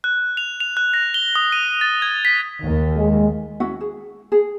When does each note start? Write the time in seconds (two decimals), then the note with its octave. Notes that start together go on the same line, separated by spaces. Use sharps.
0.04 F#6
0.37 F7
0.60 F7
0.77 F#6
0.94 A#6
1.14 G7
1.36 D#6
1.52 D#7
1.81 A6
2.02 G#6
2.25 B6
2.61 D#2
2.96 G#3
3.60 C#4 E4 F#4 F#5
3.81 G#4
4.32 G#4